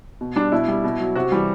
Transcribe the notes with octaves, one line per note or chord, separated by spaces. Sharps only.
B2
G3 D4
B2 E4
G3
B2
F#3
C3 F#4
E3 G3